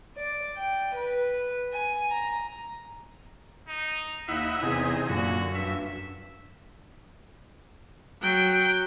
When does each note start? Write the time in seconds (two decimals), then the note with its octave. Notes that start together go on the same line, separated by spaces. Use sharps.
0.16 D5
0.56 G5
0.94 B4
1.73 G#5
2.10 A#5
3.68 D#4
4.28 D#2 D#4 E4 E5 F#5
4.63 E2 C3 D#4 G#4
5.08 F#2 A#2 D3 F#4
5.54 G2 E5
8.22 F#3 G5